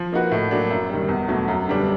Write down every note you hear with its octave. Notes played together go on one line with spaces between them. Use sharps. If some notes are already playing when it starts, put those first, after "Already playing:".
Already playing: F3
A#3 D#4 F#4 B4
A2
F#3 A#3 D4
F#2
D#3 G3
E2
B2 F#3 A3
F#2
D3 G3 B3 D4